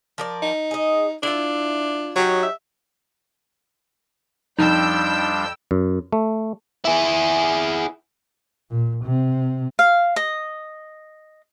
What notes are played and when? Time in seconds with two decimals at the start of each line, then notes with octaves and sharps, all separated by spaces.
0.18 F3 A#4 D5
0.43 D#4
0.71 G#4 D#5
1.23 D4 E4 F4
2.16 F#3 D#4 G4 C#5
2.43 E5
4.59 F2 F3 G3 D4 D#4 G5 E6 G6
5.71 F#2
6.12 A3
6.85 E4 G#4
8.70 A#2
9.05 C3
9.79 F5
10.16 D#5